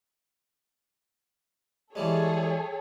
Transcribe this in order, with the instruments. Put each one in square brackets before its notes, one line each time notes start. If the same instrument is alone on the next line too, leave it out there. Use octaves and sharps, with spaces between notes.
[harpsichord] E3 G3 G#3 [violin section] G#4 A4 C#5